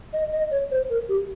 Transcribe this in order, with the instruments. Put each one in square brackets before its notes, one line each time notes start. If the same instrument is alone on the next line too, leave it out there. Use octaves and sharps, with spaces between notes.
[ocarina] D#5
D#5
C#5
C5
A#4
G4